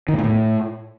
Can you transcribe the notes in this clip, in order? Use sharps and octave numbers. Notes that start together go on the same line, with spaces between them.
D#3
A2
A#2
A2